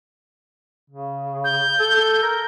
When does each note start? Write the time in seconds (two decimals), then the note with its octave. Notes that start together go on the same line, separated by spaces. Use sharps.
0.90 C#3
1.44 G6
1.80 A4
2.23 A#4